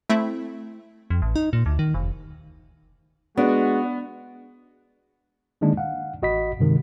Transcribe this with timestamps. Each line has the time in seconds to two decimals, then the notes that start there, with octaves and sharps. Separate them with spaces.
0.10 A3 C4 E4 E5
1.10 F2
1.22 A1
1.36 D#4
1.53 A#2
1.66 D2
1.79 D#3
1.94 F1
3.37 G#3 B3 D4 F#4
5.61 D3 D#3 G#3 A#3 D4 D#4
5.77 F5 F#5
6.22 A1 F#4 D#5 B5 B6
6.59 G2 C3 D#3 G#3